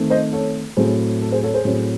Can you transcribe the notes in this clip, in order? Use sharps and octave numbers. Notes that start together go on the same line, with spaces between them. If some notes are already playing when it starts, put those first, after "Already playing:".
Already playing: D#3 A3 C4
C5 D#5
A4 C#5
A2 F#3 A3 C4 G#4 C5
A4
G#4 C5
A4 C#5
G#4 C5
A2 F#3 C4